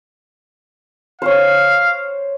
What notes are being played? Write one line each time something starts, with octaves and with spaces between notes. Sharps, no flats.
C5 C#5 F5